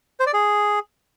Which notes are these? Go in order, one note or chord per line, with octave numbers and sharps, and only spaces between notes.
C5
D5
G#4